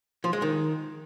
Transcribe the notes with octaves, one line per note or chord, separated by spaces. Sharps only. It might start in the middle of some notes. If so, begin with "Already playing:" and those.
F3
G#3
D#3